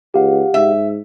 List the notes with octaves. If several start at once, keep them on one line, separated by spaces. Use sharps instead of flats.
C#2 G4 F5 F#5
G#2 E5